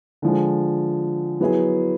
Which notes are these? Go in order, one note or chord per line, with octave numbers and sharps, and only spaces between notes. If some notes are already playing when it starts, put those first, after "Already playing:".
D3 F3 G#3
F#3 B3 E4 G#4